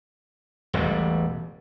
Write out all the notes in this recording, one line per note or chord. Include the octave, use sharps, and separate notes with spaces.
E1 A1 E3 G3